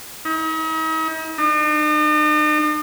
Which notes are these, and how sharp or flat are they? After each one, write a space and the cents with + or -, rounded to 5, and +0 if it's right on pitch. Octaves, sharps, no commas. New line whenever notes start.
D#4 +45
D#4 -45